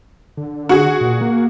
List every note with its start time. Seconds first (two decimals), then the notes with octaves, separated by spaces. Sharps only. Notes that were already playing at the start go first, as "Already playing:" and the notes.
0.37 D3
0.69 F#4 G#4
1.01 A#2
1.21 A#3